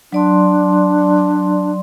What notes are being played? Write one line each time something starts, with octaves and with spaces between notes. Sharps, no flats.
F#3 D4 D5 C6